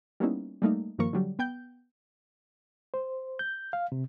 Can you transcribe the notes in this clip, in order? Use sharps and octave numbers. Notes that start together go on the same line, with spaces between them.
G3 A#3 B3 C#4 D#4 E4
G3 A3 A#3 D#4
G2 D#3 F3 A#3 A#4 C#6
D3 F#3 G3
B3 G5 G6
C5
G6
F5
C3